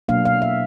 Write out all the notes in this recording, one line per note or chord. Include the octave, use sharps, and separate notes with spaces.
B2 F#3 A#3 D4 F5
F5
E5